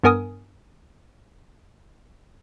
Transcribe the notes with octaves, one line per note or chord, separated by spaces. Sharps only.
G2 B3 A#4 G#5 D#6